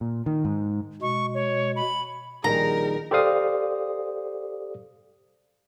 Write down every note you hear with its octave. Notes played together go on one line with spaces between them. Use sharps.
A#2
D#3
G#2
B2 G#3 C#6
C#5
B5
A#1 D#3 G3 G#4 A#4 A#5
G4 A4 C5 D5 F5 D#6